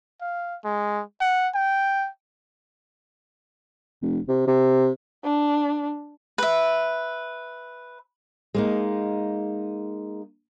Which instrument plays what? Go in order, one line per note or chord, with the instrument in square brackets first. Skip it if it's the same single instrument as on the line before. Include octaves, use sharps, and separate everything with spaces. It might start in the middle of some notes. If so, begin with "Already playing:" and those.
[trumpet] F5
G#3
F#5
G5
[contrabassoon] F1
C3
C3
[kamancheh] D4
[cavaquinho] B4 E5
[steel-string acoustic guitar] G#3 A#3 D#4